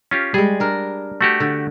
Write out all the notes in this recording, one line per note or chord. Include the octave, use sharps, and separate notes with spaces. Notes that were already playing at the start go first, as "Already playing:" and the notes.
C#4 F4 G4
G3 G#3 G#4
D4 A#4
A3 F#4 G4
D3